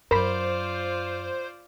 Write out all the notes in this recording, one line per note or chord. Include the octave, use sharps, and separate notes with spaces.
F#2 F4 A#4 C5 D5 B5